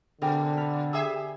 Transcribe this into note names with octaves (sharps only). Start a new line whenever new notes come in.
B2 D3 G#4 A#4 G5
D4 B5 F6
G4 G#4 E5 E6